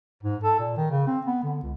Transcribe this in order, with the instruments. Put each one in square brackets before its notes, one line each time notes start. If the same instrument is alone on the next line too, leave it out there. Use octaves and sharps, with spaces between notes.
[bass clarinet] G#2
A4
A#2
D#3
C#3
C4
B3
D3
C#2